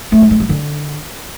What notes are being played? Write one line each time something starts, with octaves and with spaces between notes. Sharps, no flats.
A3
G#2
G#3
G2
D3